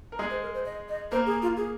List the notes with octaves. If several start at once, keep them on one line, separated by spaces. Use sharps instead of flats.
A#4
G#3 G#4 D#5
C5
A#4
C5
D#5
D#5
A#3 A#4 C5
G#4
F4
G#4